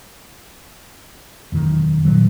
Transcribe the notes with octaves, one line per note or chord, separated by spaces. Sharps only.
E1 F#2 D#3
G2 A#2 D#3 F#3